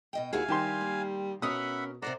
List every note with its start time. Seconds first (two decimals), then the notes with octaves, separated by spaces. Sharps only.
0.13 B2 D#5 G5
0.33 D#2 E4 F#4 G#4 F5 G#5
0.48 D#3 G3 G4 A5 C6
0.81 A#3
1.42 B2 C#4 A#4 E5 F#5 B5 D#6
2.02 C3 A#4 C5 D5 F#5 A#5